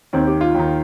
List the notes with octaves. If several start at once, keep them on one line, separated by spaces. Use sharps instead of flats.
D#2 D#3 C4
G4
F4
D#2 D#3